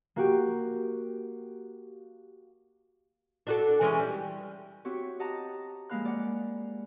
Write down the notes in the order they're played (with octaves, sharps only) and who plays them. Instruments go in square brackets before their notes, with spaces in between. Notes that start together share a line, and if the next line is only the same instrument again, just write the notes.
[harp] A#3 F#4 G4
[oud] D4 F#4 A4
E3 G#3 C#4
G3
[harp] C4 E4 F#4 G4 C#5
G4 D#5 F#5 A5 A#5
F3 G#3 A#3 F5 B5 F#6
D5 F#5